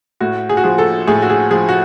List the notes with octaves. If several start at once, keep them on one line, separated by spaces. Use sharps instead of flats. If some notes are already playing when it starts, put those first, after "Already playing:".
A2 F#4
G#4
F#4
F3 G#4
A4
A2 G#4
F#4
G#4
F3 G#4
F#4